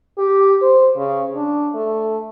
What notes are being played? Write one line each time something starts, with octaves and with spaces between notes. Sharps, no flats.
G4
C5
C#3
D4
A3